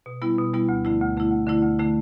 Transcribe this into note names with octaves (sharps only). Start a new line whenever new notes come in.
B2
G3 B3 E4
B2
G3 B3 E4
D2
D3 A3 E4
D2
D3 A3 E4
D2
D3 A3 E4
D2
D3 A3 E4